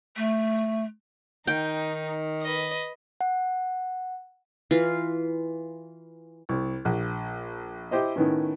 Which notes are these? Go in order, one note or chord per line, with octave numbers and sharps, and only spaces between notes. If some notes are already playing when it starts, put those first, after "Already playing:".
A3
D#3 D#4 G5
B4 D#5
F#5
E3 F4
C2
A#1
E4 G4 C5 D#5
A2 D#3 B3 C#4